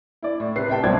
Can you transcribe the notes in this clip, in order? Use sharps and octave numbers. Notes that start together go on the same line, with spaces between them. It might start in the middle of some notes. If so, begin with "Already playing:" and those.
E4 D5
A2
C3 B4 C7
E5 G5 A5
C2 B2 F#3 C4 D5 G#6